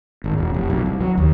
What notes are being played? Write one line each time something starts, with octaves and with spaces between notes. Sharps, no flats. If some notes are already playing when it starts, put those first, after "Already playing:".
G#1
E1
F1
B1
C2
F#3
D#2